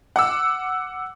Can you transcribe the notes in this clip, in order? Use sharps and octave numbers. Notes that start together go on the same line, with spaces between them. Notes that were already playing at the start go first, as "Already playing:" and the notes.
F#5 D6 E6